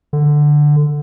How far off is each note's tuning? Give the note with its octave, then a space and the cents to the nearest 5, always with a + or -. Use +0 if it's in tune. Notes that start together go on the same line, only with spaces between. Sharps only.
D3 +5